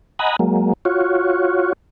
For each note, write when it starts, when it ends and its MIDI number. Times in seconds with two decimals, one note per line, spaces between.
0.19 0.36 75
0.19 0.36 78
0.19 0.36 80
0.19 0.36 82
0.19 0.36 83
0.39 0.73 54
0.39 0.73 56
0.39 0.73 58
0.85 1.73 65
0.85 1.73 66
0.85 1.73 73